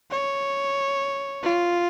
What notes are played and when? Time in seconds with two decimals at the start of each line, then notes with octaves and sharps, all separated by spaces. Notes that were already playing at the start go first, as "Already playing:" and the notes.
0.11 C#5
1.43 F4